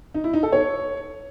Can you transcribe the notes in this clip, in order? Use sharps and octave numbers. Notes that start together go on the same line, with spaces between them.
D#4
E4
D#4
A4
C#5